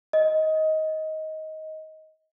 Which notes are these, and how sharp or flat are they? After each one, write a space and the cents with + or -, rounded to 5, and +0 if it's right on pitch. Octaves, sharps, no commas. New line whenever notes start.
D#5 +15